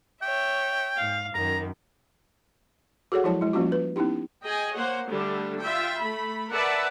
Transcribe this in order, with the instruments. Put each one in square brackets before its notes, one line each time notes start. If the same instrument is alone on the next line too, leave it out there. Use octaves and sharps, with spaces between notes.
[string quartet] C#5 E5 [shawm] G5
[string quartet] G#2 F5
[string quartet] F#2 D#3 [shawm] A#5
[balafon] F#4 G#4 A4 C#5 F#5
F3 F#3 G#3 E4 C#5 A5
G#3 E4
F3 G3 A#3 C#4 F4 F#4
B4
B3 C#4 D#4 E4 G4
[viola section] G#4 D#5 G5 G#5
A#3 C5 C#5 F#5
D3 G3 A3 D4
F4 E5 G5
A3 B5
A#4 B4 D5 E5 F#5 A5